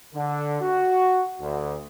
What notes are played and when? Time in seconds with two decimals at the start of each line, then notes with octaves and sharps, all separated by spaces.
0.14 D3
0.62 F#4
1.40 D2